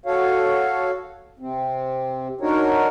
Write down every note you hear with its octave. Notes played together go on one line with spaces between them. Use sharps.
F#4 A4 C#5 F5
C3 C4
D4 D#4 F#4 A#4 C#5